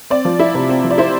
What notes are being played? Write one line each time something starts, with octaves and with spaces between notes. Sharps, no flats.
C4 D5
F3
E4
C3
C4
F3
D5
E4 C5